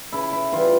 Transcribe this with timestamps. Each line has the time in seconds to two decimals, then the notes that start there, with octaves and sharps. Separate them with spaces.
0.12 C#3 E4
0.33 E4
0.52 E3 G3 F4